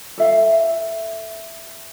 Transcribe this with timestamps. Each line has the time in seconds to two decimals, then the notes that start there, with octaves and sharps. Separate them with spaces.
0.18 A4 E5 F5